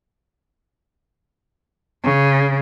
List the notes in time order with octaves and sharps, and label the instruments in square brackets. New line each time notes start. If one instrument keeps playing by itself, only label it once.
[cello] C#3